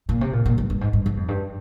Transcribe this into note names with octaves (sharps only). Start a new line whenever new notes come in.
A#2
C3
A#2
A#2
G2
G2
G#2
G2
G2
F2
G2